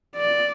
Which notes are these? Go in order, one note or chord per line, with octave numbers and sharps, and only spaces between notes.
D5